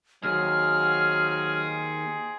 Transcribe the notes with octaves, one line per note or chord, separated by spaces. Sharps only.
D#2 F#3 C4 D#4 G#4 F6